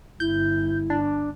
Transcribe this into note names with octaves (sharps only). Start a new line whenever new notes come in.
G1 E4 G6
D4